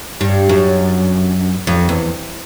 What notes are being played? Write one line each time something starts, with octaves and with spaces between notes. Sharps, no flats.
G2
F#2
F2
E2